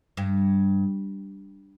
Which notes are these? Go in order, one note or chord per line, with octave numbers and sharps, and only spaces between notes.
G2